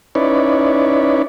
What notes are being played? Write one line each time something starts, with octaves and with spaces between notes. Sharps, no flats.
C#4 D#4 E4 B4 C#5 D5